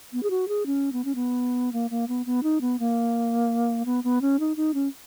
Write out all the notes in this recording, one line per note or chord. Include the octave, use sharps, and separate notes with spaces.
B3
G#4
F#4
G#4
C#4
B3
C#4
B3
A#3
A#3
B3
B3
D#4
B3
A#3
B3
B3
C#4
D#4
D#4
C#4